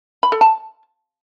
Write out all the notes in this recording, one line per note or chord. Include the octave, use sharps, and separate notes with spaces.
B5
A4
A5